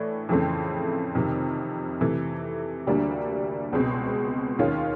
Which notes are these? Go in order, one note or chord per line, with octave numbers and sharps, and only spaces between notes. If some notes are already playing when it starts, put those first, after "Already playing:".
Already playing: A2 E3 A3 D4
F2 C#3 E3 A3 C4
F2 C3 D#3
C3 E3 A3
D2 D3 G3 A#3 D4
C#2 B2 G#3 C4
D#2 D#3 G#3 C#4 F4